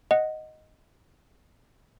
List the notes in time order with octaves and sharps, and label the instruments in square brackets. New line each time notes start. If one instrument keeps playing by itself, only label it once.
[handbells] D#5 F#5